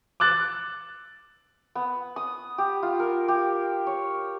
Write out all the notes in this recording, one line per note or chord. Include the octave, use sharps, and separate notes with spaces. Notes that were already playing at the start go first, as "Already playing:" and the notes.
D6 E6 F#6 A6
B3
D#6
G4
F4
A#4
G4
C#5